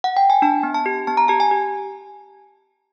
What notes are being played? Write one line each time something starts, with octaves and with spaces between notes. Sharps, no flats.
F#5
G5
G#5
D4 A5
B3
A5
G4
B3 A5
A#5
G4 A5
G#5
G4